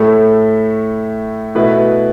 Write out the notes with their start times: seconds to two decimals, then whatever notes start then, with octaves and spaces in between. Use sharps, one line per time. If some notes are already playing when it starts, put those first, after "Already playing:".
Already playing: A2 A3 E4 A4
1.55 B2 A3 E4 B4